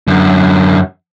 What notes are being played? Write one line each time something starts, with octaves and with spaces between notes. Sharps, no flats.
F#2 D3